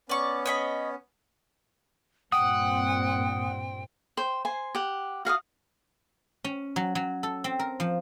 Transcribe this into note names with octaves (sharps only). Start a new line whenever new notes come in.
B3 C#4 D5 C#6
C#5 D#5 B5
G2 A#2 C4 F#5 G5 D#6
C5 G5
C5 G#5 C6
G4 F#5
F#4 F5 G5 D#6
C#4
F#3
F#3
A4
C4
A#4
F3